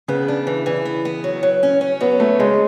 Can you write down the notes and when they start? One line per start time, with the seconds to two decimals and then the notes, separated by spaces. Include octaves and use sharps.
0.08 C#3 B3
0.28 D4
0.47 E3
0.66 E3
0.85 B3
1.05 B3
1.24 F#3
1.43 F#3
1.63 C#4
1.81 C#4
2.01 F#3 B3
2.20 A3 C#4
2.39 C#3 G#3